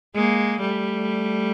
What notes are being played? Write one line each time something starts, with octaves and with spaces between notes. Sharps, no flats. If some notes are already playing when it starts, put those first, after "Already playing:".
G#3 A#3
G3 A3